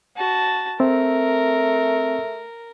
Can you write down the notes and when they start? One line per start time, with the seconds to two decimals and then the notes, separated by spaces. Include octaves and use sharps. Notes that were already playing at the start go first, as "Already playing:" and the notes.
0.17 F#4 A5
0.80 A3 C4 A#4